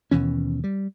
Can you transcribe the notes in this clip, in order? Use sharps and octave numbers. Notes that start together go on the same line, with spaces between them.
D#2 B2 E3 C#4
G3